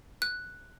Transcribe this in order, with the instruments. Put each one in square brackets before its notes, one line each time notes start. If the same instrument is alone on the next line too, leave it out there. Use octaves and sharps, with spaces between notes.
[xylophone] F#6